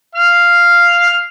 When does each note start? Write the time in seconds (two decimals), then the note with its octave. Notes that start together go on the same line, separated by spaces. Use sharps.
0.15 F5 F6